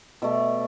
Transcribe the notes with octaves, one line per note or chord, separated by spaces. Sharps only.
B2 A3 D5